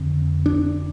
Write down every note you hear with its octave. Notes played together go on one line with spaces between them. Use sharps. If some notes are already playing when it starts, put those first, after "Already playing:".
Already playing: F2 D3 C4
D4